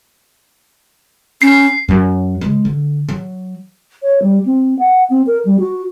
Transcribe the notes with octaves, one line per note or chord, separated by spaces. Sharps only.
C#4 C7
F#2 F#3
C#3 G#3
D3
F#3
C#5
G3
C4
F#5
C4
A#4
G3
F#4